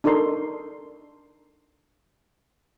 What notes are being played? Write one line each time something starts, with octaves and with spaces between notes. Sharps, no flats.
D4 D#4 A4 A#4 C6